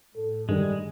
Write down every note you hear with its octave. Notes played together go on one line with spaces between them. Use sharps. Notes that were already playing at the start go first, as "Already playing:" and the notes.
A2 A4
G2 D3 D#3 G3 G#3